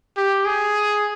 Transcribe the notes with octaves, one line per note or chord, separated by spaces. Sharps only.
G4
G#4